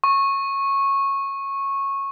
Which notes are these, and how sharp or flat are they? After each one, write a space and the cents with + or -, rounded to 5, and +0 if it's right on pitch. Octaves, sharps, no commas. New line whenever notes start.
C#6 -15